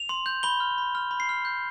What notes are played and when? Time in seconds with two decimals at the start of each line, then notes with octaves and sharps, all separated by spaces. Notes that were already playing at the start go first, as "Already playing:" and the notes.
Already playing: F7
0.09 C6
0.26 G6
0.43 B5 G7
0.60 F6
0.78 B5
0.95 F6
1.11 B5
1.20 C7
1.29 F6
1.45 G6